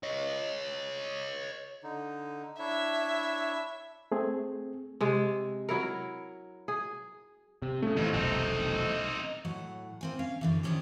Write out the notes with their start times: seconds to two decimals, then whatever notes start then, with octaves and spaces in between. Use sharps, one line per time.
0.03 C#5 D#5
1.84 D3 D#4
2.59 D4 E4 C#5 E5
4.12 A3 C4 G#4
5.01 C3 G#3
5.69 F#3 E4 A#4
6.68 G#4
7.62 C3
7.82 A#2 C#3 A3
7.97 F2 A2 E3
8.14 F1 B1 C4 D#4
9.45 A2 F#3 F#5
10.01 A#3 C4 G#5
10.19 C#4 F5
10.41 F#2 D3 E3
10.63 D#3 F3 C#4 D4 G4